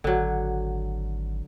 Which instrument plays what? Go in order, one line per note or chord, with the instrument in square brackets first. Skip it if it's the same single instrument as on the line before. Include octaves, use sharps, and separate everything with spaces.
[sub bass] G#1 [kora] D3 F#3